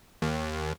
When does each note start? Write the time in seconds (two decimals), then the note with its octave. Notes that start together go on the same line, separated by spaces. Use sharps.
0.22 D#2